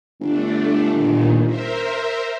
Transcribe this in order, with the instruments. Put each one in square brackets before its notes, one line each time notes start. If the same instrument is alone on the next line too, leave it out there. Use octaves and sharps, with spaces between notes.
[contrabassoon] G1 [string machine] A3 D4
[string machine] A#2 D#3
A#4 C5 E5